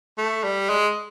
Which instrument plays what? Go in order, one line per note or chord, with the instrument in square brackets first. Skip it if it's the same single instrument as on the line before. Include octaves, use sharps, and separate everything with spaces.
[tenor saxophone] A3
G3
G#3